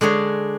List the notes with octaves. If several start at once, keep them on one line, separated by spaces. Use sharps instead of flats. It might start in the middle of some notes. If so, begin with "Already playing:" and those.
D3 G#3 D4 G#4 C#5